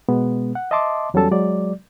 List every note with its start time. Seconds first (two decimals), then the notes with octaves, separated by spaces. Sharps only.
0.09 B2 G#3 B3
0.55 F#5
0.71 D#5 E5 A5 C6 D6
1.14 E2 F#3 G3 C#4 A4 A5
1.31 F#3 G#3 D5